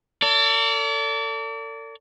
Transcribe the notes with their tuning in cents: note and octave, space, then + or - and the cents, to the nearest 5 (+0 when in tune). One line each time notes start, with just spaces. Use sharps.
A4 +40 D5 -35